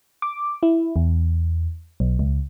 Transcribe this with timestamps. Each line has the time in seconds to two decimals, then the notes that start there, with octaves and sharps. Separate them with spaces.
0.22 D6
0.63 E4
0.96 E2
2.00 B1
2.19 C#2